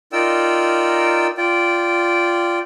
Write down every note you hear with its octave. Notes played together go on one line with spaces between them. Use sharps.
D#4 F4 A#4 D5 G5 E6
F4 D5 G5